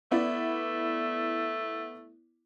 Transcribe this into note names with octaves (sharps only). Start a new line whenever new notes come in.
A3 B3 E4 D5